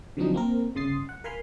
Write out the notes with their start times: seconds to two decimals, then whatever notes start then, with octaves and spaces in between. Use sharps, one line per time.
0.17 D3 F3 F#3 C4 D4 D#4
0.34 A#3 C4 A#4
0.75 G1 C#3 C6 D#6 A6 C7
1.09 F#5
1.24 A#4 F5 G#5 B5 C6 F6